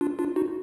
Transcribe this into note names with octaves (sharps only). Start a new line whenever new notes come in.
D4 F4
D4 F4
D#4 F#4